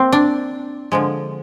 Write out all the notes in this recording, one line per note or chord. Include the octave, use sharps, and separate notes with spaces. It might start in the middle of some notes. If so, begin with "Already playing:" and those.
Already playing: A#3 C4
D4
D3 F3 G#3